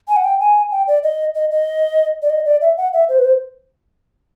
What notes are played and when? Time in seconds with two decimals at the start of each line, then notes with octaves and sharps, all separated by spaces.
0.08 G#5
0.16 F#5
0.24 G5
0.40 G#5
0.72 G5
0.87 D5
1.03 D#5
1.35 D#5
1.51 D#5
2.22 D5
2.30 D#5
2.45 D5
2.62 E5
2.77 F#5
2.93 E5
3.09 C5
3.19 B4
3.25 C5